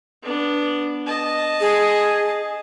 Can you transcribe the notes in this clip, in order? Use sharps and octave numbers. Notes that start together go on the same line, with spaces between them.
B3 D4
D#5 A5
G#4